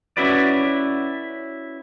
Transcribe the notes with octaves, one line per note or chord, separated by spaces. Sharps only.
C#4 E4 F#4 B4 D5